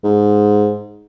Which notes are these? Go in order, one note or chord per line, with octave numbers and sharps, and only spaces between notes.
G#2